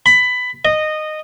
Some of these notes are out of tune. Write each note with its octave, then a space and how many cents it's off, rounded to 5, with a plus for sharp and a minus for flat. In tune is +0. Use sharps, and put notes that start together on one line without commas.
B5 +15
D#5 -15